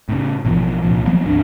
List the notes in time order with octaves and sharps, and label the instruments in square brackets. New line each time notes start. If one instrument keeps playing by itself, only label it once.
[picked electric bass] A2 C#3
A1 B2 E3 F3
C2 A#2 F3
F3 F#3 A#3 B3
G#1 D2 D4